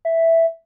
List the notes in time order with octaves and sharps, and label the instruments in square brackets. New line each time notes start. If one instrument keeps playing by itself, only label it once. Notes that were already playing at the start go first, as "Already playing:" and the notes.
[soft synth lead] E5